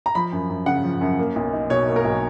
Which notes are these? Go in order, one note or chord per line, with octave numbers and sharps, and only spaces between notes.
A#5
F3 B5
F#2
F#2
C#3 F#5
F3
F#2
A#3
B1
D#4
B2 C#5
A#3
A#4
B1